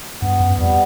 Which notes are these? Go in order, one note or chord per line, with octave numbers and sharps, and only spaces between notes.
G2 B3
F#2
F2 G3